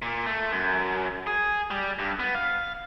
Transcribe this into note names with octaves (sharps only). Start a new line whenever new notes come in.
A#2
A3
F#2
G#4
G3
G2
B3
F5